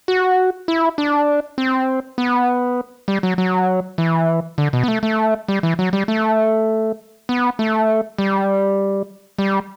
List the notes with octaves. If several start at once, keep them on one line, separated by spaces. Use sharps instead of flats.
F#4
E4
D4
C4
B3
G3
F#3
F#3
E3
D3
B2
B3
A3
A3
G3
E3
F#3
G3
A3
B3
A3
G3
G3